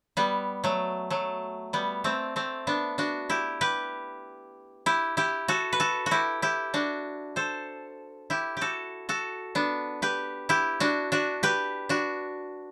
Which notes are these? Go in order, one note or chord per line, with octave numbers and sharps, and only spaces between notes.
G3 B3
F#3 A3
F#3 A3
G3 B3
A3 C4
A3 C4
B3 D4
D4 F#4
E4 G4
G4 B4
E4 G4
E4 G4
F#4 A4
B4
F#4 A4
F#4
E4 G4
E4 G4
D4 F#4
A4 C5
E4 G4
F#4 G4 A4
F#4 A4
B3 D4
G4 B4
E4 G4
D4 F#4
D4 F#4
G4 B4
D4 F#4